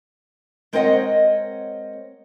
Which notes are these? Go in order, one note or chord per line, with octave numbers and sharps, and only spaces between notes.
G#3 C4 A#4 C#5 D#5 F#5